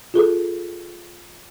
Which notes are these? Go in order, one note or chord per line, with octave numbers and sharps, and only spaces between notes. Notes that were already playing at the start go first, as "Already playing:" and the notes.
F4 G#4 A4